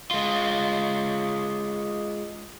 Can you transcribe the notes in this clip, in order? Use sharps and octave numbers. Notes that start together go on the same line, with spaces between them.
G#3 F4